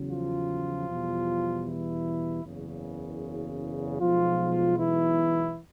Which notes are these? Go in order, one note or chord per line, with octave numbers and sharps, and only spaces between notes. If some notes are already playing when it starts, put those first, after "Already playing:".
Already playing: E2 C#3 F#3
F3 F4
E2 B2 G3
E3 E4
F#1 E2 C#3
B1 B2 F3 G#3 F4
E3 E4